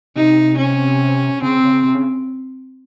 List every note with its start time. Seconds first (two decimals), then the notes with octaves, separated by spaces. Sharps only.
0.16 C3 D#4
0.58 C#4
1.42 C#3 C4
1.64 C#3
1.84 C3
1.94 C#3